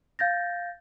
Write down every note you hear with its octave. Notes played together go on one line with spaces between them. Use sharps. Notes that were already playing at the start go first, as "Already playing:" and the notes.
F5 G6 A6 A#6